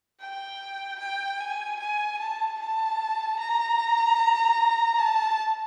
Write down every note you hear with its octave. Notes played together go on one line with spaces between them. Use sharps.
G5
G5
G#5
G#5
A5
A5
A#5
A5